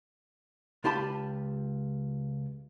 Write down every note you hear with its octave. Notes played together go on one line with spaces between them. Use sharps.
C#2 F4 G4 A5 B5